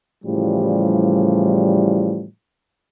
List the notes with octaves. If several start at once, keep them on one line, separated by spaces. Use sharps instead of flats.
A2 C#3 E3 F3 G3